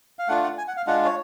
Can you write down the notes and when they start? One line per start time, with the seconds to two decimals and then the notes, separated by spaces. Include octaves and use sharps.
0.19 F5
0.28 A3 D4 F4 F#5
0.43 F#5
0.58 G#5
0.68 F#5
0.77 F5
0.87 G#3 D4 F4 F#5
1.05 C#5